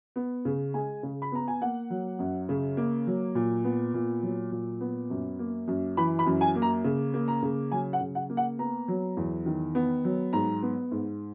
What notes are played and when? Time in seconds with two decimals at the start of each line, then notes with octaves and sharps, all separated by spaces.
0.16 B3
0.45 C#3
0.74 G#3 G#5
1.03 C#3
1.22 B5
1.32 B3 A#5
1.48 G#5
1.61 A#3 F#5
1.90 F#3
2.19 F#2
2.49 C#3
2.77 A#3
3.07 F#3
3.35 A#2
3.64 B3
3.94 A#2
4.23 F#3
4.52 A#2
4.81 B3
5.10 F#2
5.39 A#3
5.68 F#2
5.97 E3 B5
6.19 B5
6.26 F#2
6.41 G#5
6.55 A#3
6.62 A#5
6.84 C#3
7.14 A#3
7.28 A#5
7.42 C#3
7.72 F#3 G#5
7.93 F#5
8.01 C#3
8.15 F#5
8.30 A#3
8.37 F#5
8.59 B3 A#5
8.88 F#3
9.17 E2
9.46 D#3
9.75 B3
10.05 F#3
10.33 G#2 A#5
10.63 B3
10.91 G#2